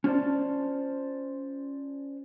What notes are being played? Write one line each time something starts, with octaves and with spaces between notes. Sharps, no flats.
C#4 F4 C5 D5 A5